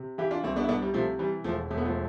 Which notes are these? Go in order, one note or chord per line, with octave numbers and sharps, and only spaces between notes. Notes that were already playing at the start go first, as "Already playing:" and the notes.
Already playing: C3
E3 E4 G4
D4 F4
C2 C4 E4
B3 D4
E4
C2 B3 D4
G3
C3 F3 A3
E3 G3
E1 F3 A3
E1 A3
B3
F3 A3